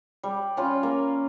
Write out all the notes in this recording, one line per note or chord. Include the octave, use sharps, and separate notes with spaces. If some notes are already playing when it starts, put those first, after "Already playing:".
G3
C#4 F4
A#3